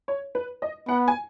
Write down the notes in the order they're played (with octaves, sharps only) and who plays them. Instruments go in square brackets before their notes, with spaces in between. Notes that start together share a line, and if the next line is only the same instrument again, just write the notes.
[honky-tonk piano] C#5
B4
D#5
[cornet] B3 [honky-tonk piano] F#5
[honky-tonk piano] G#5